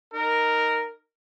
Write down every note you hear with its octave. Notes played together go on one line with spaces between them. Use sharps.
D#4 A#4